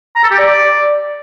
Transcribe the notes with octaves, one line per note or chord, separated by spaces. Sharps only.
A#5
A4
G4
D5